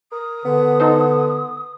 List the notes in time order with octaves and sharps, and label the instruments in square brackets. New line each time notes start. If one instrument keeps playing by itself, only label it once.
[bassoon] A#4 [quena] D#6
[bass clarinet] D3 [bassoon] B3
[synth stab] D#4 A4 C5